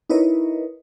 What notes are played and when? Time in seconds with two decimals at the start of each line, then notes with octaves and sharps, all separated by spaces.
0.10 D#4 E4 A#4 B4 C#5 D#5